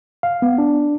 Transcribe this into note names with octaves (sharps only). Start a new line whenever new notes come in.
F5
B3
D4